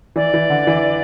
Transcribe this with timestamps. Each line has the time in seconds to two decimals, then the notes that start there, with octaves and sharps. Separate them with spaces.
0.16 E3 D5
0.34 E3
0.50 D3
0.67 E3